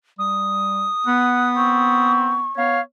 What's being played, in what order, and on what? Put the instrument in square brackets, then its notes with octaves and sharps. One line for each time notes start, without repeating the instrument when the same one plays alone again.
[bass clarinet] G3 [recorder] D#6
[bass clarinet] B3 [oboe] F#5
[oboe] C4 [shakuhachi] C#6
[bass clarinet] B3 [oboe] C#5 [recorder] F5